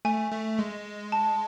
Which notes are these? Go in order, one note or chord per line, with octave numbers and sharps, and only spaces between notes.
A3 G#5
A3
G#3
A5